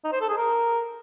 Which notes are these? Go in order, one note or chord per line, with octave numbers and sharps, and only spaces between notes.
D#4
C5
A4
G#4
A#4